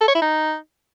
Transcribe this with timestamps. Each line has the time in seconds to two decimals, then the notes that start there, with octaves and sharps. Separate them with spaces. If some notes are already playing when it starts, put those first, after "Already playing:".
0.01 A4
0.08 C#5
0.15 E4
0.22 D#4